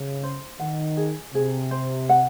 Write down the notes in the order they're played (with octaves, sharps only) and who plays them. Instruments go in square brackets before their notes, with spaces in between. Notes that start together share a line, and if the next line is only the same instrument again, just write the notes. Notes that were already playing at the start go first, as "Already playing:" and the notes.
Already playing: [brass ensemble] C#3
[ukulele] C5
[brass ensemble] D#3 [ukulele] F#5
[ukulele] G#4
[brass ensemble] C3 [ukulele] G#4
[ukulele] C5
F#5